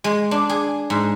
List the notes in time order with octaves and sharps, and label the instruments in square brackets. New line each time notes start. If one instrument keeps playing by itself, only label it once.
[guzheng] G#3
D4
G#4
G#2